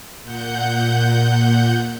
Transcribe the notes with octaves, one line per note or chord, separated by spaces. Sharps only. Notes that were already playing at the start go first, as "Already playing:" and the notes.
A#2 F#5 G6